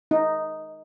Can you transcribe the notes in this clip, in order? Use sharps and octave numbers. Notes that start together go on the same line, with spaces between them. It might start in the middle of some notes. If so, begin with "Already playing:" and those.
D#4